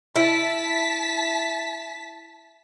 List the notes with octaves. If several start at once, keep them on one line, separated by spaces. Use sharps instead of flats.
E4 A5 B6